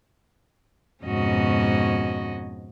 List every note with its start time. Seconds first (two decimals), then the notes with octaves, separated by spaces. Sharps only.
1.04 F2 G#2 B2 C#4 F#4 D#5